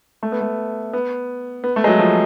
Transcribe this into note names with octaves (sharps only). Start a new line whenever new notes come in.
A3
B3
A3
B3
B3
A3
G#3
F#3
F3